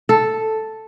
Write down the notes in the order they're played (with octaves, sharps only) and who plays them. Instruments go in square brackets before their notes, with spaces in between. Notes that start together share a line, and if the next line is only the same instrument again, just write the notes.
[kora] A4